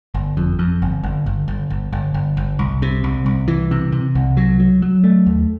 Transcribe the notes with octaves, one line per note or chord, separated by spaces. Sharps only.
G1
F2
F2
G1
G1
G1
G1
G1
G1
G1
G1
C2
C3
C2
C2
E3
C3
C3
C2
F#3
F#3
F#3
A3
D#2